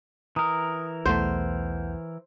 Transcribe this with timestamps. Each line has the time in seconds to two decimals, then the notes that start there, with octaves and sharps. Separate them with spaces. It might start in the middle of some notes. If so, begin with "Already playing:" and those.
0.36 E3 A#4 A#5 D#6
1.06 B1 E2 A3 C5 F#5 G6